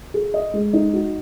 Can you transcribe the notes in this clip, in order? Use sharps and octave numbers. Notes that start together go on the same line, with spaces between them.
G#4
D#5
G#3
D#4
F#4